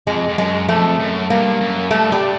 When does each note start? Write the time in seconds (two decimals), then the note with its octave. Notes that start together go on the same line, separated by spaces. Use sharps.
0.07 F2 G#3
0.29 F2
0.38 F#2 G#3
0.68 F2 A3
0.99 F#2
1.30 G2 A#3
1.61 F#2
1.91 G2 A3
2.12 G3